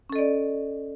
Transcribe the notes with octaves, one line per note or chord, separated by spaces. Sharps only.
C#4 A4 D5 D#5